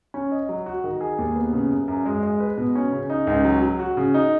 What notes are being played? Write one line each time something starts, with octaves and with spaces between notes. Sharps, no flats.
C#4
D#5
F#3
F#4
D#3
G#4
D#2
B3
C#3
F#2
F#2
G#3
G#3
B4
B2
C#4
C#3
D#4
C#2
F#3
F#3
F#4
C#3
D#4